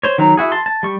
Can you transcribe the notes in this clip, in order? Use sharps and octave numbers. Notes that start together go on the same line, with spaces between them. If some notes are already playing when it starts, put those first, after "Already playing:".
C5 C#5
D#3 F#3 A#5
E4 F#4 G#4
A5 C6
A5
G3 C#6